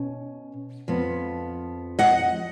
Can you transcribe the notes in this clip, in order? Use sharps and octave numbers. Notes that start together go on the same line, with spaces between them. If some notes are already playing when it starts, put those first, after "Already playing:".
Already playing: B2 C#4
F2 F3 B3
D#5 F#5